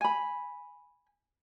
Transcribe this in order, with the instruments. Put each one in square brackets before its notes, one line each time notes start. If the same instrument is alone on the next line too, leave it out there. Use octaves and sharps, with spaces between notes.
[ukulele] G#5 B5